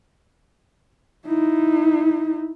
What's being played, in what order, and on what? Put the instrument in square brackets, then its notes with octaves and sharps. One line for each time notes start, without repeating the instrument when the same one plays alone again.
[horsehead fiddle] D#4 E4